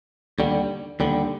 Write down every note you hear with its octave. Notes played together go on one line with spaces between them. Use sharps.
D#2 D3 G3
D#2 D3 G3